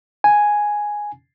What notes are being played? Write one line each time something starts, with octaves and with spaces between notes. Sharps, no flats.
G#5